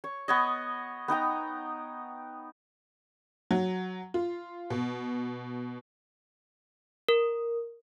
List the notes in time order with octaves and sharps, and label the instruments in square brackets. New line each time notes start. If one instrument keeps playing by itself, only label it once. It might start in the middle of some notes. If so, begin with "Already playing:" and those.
[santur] C#5
B3 C#5 D#5
B3 D#4 G5 A#5
[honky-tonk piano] F#3
F4
B2
[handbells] A#4